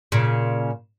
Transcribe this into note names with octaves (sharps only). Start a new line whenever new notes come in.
A#2 C#3